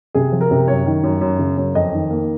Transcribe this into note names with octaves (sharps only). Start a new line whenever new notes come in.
C3 G#4
F3
A#4
C3
F#2 C#5
D#3
F#2
F#2
C#3
F#2
F2 D#5
D#3
A#3